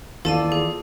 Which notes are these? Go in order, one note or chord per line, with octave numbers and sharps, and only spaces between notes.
D#2 E3 F4 A4 D5 A5 D#7
G#4